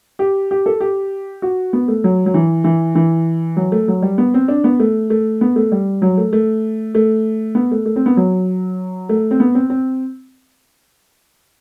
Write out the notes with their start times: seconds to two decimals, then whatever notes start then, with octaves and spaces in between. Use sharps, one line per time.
0.19 G4
0.51 G4
0.66 A4
0.80 G4
1.42 F#4
1.73 B3
1.88 A3
2.04 F#3
2.26 F#3
2.34 E3
2.64 E3
2.95 E3
3.57 F#3
3.72 A3
3.88 F#3
4.02 G3
4.18 B3
4.34 C4
4.48 D4
4.64 B3
4.80 A3
5.10 A3
5.41 B3
5.56 A3
5.72 G3
6.02 F#3
6.17 A3
6.33 A3
6.95 A3
7.55 B3
7.71 A3
7.86 A3
7.96 C4
8.06 B3
8.17 F#3
9.09 A3
9.31 C4
9.40 B3
9.55 C4
9.70 C4